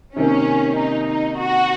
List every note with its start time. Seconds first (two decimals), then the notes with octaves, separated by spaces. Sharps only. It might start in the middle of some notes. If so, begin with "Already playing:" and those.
0.16 C3 D#3 A#3 C#4
0.77 D#4
1.08 D#4
1.39 F#4